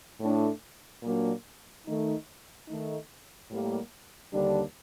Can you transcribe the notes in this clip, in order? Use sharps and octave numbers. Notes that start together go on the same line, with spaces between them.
A2 A3 D4
A#2 F#3 A#3 D4
D#3 A3 D#4
D#3 A3 D#4
A2 G3 A#3
D#2 D3 G3 D4